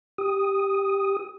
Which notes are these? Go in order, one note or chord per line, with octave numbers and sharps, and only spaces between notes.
G4 D#6